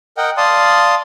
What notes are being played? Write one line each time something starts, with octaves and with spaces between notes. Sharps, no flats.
A#4 D#5 F#5 G5
D5 F5 A5 C6 D#6